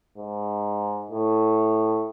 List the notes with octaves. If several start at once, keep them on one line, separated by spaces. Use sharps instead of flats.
G#2
A2